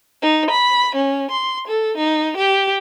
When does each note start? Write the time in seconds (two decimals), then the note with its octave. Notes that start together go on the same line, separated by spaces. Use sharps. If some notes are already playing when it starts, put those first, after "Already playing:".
0.22 D#4
0.51 B5
0.95 C#4
1.31 C6
1.67 A4
1.97 D#4
2.37 G4